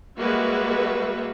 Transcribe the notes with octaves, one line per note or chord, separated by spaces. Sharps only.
G3 G#3 A#3 F#4 B4 E5